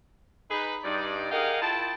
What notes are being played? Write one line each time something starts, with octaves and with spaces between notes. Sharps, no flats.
D#4 G#4 B4
G2 D#4 D5
G4 G#4 A#4 D#5 F5 F#5
E4 F4 G5 A5